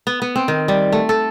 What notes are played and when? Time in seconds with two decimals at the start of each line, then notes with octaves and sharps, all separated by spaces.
0.07 B3
0.22 B3
0.36 C4
0.48 D#3
0.68 G3
0.93 A3
1.09 A4